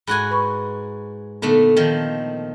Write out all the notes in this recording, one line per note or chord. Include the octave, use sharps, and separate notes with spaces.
G#2 F#4 G#5 B5 F#6 G#6
B4 B5 C#6
A#2 D3 A3 B3 D#4 A4
D#3 F3